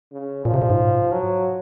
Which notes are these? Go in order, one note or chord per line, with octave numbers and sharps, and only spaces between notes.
C#3
A#2 F3
C3
A#2
G#2
F#3